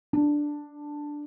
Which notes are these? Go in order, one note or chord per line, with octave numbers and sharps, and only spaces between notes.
D4